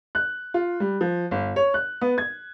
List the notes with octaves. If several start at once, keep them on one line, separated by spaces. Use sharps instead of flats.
F#6
F4
G3
F3
G1
C#5
F#6
B3
G#6